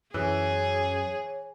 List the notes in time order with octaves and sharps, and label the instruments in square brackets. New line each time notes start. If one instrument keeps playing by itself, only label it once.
[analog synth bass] F#2 [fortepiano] E3 [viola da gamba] G#4 [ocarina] C#5